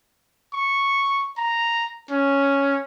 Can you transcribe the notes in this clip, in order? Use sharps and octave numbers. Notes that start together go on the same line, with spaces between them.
C#6
A#5
C#4